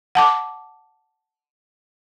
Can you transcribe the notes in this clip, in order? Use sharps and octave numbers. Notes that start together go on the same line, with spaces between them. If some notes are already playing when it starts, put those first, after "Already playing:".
F#5 A5 D6